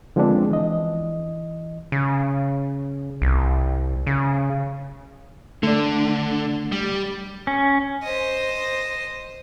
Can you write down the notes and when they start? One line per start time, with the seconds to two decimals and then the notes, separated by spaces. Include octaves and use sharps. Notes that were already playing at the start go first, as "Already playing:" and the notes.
0.16 D3 F3 G#3 B3 C4 D4
0.51 E3 D#5
1.92 C#3
3.22 C2
4.07 C#3
5.63 D3 A3 D5
6.72 G3
7.47 C#4
8.03 C5 D#5